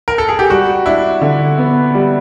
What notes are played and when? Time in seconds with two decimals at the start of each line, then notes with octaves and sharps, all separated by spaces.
0.08 A#4
0.18 A4
0.29 G#4
0.39 G4
0.50 G3 F#4
0.86 D4 E4
1.21 D3
1.58 B3
1.94 G3